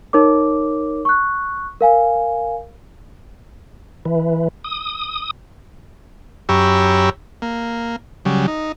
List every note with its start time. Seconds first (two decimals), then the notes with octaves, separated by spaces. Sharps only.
0.13 D#4 A#4 C#5 D6
1.05 C#6 F#6
1.81 A#4 F5 G#5
4.05 E3
4.64 D#6
6.49 F#2 G4 C#5 A#5 B5 E6
7.42 A#3
8.25 C#3 F#3 G3
8.47 D#4